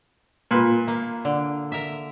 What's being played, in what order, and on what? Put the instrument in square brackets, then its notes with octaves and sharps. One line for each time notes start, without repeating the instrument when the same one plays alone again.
[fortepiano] A#2 B4
[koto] A#3
D3
A#4 E5